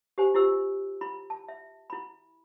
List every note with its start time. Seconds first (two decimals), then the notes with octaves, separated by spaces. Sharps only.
0.18 G4 C5 G#5
0.34 E4 F4 G4 C5 E6
1.01 E4 B5
1.30 A5
1.48 E5
1.90 E4 B5